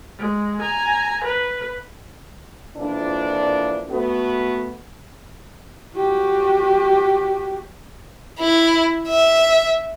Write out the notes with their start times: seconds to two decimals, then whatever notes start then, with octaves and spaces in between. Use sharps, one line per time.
0.18 G#3
0.61 G#5 A#5
1.24 B4
2.77 F2 A#2 E3 D4
3.89 A3 B3 F#4
5.96 F#4 G4
8.40 E4
9.08 E5